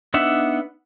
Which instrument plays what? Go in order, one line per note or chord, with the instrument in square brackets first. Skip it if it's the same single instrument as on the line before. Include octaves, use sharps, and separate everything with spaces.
[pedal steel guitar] B3 D4 D#4 E5 F#5